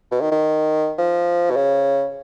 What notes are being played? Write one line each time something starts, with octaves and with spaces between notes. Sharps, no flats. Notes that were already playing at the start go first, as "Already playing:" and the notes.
B2
D#3
D#3
F3
B2
C#3